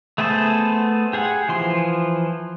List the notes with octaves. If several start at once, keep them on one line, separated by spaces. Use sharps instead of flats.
A3 B3 G#4 A4 C5
G4 G#4 F#5
E3 F3 C6